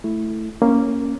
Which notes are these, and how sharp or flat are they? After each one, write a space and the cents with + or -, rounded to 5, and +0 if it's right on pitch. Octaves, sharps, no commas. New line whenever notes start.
A3 +0 E4 +0
A#3 +0 C#4 +0